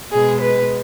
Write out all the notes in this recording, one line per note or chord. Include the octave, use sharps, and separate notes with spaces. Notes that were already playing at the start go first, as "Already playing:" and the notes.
B2 G#3 G#4
B4